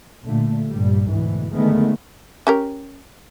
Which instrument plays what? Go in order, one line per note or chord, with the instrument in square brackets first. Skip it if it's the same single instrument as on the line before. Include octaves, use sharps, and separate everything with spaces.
[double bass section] A#2 D3 A3
A#1 G2 G3
D2 G#2 B2 E3
D3 D#3 G#3 A3 B3
[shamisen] C#4 G4 A#4